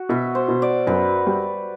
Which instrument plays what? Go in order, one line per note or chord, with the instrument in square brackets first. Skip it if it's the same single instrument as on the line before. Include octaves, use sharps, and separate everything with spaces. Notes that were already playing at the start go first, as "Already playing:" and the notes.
Already playing: [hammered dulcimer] F#4
[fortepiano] B2 [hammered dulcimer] E5
[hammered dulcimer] C5
[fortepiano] B2
[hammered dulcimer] D5
[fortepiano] F#2 [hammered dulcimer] B4
[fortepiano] G3